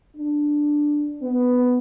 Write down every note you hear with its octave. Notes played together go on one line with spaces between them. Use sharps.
D4
B3